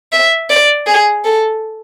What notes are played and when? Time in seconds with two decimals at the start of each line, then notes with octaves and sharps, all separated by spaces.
0.13 E5
0.50 D5
0.87 G#4
1.25 A4